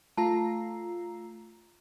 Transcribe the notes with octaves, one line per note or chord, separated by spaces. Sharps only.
A3 F4 A5 A#5